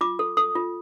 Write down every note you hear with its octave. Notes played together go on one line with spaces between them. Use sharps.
F4 D6
A4
A4 D#6
F4